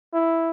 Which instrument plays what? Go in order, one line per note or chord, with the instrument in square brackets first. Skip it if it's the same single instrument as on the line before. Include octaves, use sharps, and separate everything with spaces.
[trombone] E4